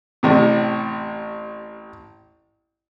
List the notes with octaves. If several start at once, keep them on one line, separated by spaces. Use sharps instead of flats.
A1 A2 C3